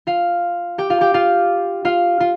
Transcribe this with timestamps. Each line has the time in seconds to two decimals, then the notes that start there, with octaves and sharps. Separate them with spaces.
0.07 F4 F5
0.78 G4 G5
0.90 F4 F5
1.01 G4 G5
1.14 F4 F5
1.85 F4 F5
2.20 F4